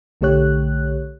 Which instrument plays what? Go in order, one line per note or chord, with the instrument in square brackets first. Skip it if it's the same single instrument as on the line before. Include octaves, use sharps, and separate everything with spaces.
[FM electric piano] B1 D3 A3 G4 C#5 F#6